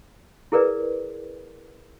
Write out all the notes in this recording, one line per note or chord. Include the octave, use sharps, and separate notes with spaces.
E4 G#4 A#4 B4 D5